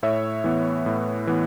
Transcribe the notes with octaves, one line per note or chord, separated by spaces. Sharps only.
A2 C#5 E5
E3 B3
A2
E3 B3